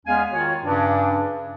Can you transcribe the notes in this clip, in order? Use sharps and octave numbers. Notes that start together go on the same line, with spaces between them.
E2 G#3 B3 C#4 F5 G#5
D#3 F4 F#4 C#5
G2 C#3 C#4 D4